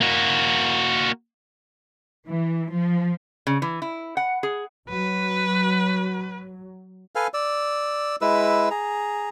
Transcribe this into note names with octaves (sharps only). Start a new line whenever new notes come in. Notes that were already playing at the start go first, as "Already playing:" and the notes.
A#3 F#4
E3
F3
C#3
E3
E4
F#5
G#4
F#3 B4
A4 B4 F5 G#5
D5 E6
G#3 E4 B4 E6
G#4 A#5